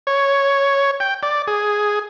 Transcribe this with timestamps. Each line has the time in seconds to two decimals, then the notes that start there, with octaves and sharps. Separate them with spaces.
0.07 C#5
1.00 G5
1.23 D5
1.47 G#4